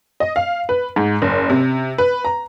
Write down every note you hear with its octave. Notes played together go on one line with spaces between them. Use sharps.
D#5
F5
B4
G#2
F#1
C3
B4
A#5